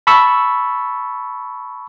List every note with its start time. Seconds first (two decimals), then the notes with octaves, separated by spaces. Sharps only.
0.07 A5 B5 C#6 E6